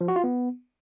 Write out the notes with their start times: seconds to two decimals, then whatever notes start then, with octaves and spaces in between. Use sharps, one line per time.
0.01 F3
0.08 F#4
0.16 F4
0.24 B3